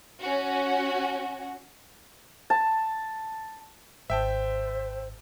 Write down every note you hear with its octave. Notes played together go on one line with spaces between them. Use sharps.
C#4 F#4
A5
G#1 C5 E5 G5 A5